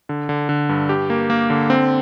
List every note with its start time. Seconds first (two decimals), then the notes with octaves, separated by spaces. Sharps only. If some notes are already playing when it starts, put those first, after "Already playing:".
0.09 D3
0.29 D3
0.49 D3
0.69 G2
0.89 G4
1.10 A#3
1.30 A#3
1.50 D3
1.70 C4